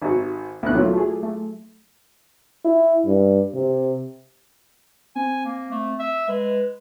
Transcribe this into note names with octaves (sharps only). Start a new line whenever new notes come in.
G#1 D#4 F#4
D2 B2 E4 F#6
A#2 F#3 A3 F4
A3 G#4
A3
E4
G2
C3
C4 G#5
A#3
A3
E5
G#3 B4